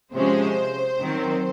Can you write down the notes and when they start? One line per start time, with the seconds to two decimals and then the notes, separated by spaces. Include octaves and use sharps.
0.14 C3 F3 G#3 C#4 C5
1.01 D#3 F#3 C4